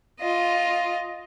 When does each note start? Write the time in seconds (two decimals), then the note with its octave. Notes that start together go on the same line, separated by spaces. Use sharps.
0.20 F4 D#5